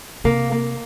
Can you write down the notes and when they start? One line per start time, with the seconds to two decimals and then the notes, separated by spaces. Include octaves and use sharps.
0.24 C3 A#3
0.52 A#3